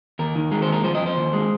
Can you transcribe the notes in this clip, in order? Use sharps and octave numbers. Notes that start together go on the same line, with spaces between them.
D#2 A#4
D#3
G#3 A#4
C5
D#2
A#4
F3 C5
D#5
F2
C5
D#2
G#3